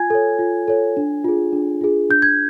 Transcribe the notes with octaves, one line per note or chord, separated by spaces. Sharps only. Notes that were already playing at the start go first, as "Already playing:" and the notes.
Already playing: F4 G#5 G#6
A4 C#5
F4
A4 C#5
D4
F4 G#4
D4
F4 G#4
D4 G6
G#6